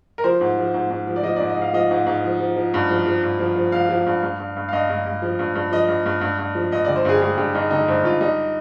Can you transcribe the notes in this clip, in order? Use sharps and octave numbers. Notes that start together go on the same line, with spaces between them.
A#4
F3 C5
G#2
F3
G#2
G#2
F3
D5
F3 D#5
D5
G#2
D#5
G#2 F5
F3 D#5
G#2
G#2
F3
F3
F3
G2
F3
F3
G2
F3
F3
F3 F5
F3
G2
G2
G2
G2
F5
G2 D#5
G2
G2
F3
G2
G2
F3 D#5
G2
G2
G2
G2
F3
G2 D#5
D3 D5
C5
G2 G#4
G4
G2 G#4
G2 G4
G2 D#4
D3 D#4
G2 C5
G2 F4
G3 D#4